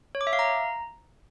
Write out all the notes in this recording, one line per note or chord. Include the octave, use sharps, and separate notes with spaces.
C#5
D6
E5
F5
A#5